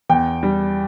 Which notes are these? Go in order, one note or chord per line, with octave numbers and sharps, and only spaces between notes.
E2 G5
G3